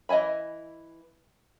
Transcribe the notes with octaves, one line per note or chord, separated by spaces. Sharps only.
E3 D#5 E5 G#5 B5